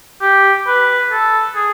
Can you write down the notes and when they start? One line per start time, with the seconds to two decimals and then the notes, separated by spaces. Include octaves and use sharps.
0.22 G4
0.67 B4
1.12 A4
1.56 G#4